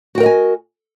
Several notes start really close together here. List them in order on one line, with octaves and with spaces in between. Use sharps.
F#4 G5 A#4 D#5 G#5